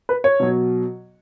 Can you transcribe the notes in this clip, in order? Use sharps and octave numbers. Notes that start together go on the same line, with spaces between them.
B4
C#5
B2 F#3